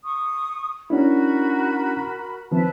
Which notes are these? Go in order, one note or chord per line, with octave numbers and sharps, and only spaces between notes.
C#6 D#6
C#4 D4 E4 F#4 A#4 B5
D#3 F3 C4 B4 E5 A5